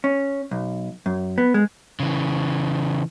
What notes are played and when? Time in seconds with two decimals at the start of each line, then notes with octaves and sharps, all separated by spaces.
0.04 C#4
0.51 B1
1.06 F#2
1.38 B3
1.54 G#3
2.00 C#3 E3